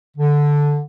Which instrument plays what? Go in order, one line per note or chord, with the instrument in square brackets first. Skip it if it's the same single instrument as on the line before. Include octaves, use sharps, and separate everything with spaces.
[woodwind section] D3